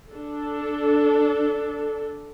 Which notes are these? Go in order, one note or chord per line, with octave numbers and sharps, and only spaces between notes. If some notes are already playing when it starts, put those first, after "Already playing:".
D4 A4